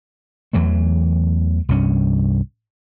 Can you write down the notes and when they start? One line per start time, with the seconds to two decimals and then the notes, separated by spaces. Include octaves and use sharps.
0.53 E2 E3 F#3 A3
1.69 C2 G2 C#4